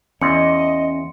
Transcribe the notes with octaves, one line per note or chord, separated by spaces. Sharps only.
E2 C#4 D#5 C6 C#7